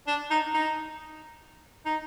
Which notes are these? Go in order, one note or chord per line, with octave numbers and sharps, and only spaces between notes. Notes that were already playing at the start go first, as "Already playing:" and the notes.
D4
D#4
D#4
D#4